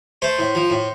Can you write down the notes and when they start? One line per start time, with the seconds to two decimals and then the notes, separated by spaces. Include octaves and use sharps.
0.22 A3 C5
0.39 A2
0.55 F3
0.70 A2